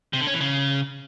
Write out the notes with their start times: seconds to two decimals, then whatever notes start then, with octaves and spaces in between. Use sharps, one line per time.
0.13 C3
0.20 D3
0.27 C#4
0.34 E3
0.41 C#3